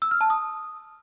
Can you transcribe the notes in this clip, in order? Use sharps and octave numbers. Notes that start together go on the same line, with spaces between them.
E6
F6
A5
D#6